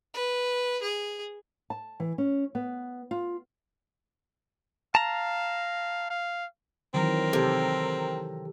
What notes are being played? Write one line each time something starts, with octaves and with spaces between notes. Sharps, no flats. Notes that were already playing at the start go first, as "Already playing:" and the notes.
B4
G#4
A5
E3
C#4
B3
F4
F5 A5 A#5
F5
D#3 E3 F#3 C4 A#4
C3 A4